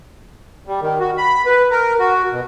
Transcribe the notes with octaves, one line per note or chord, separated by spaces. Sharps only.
G3
D#3
F#4
B5
B4
A#4
F#4
B2